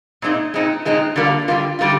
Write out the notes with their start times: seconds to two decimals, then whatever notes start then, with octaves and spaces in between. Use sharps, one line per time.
0.22 A#2 G#3 C4 D#4
0.54 A#2 G#3 C4 D#4
0.85 A#2 G#3 C4 D#4
1.16 D3 G3 A#3 F4
1.48 D3 G3 A#3 F4
1.79 D3 G3 A#3 F4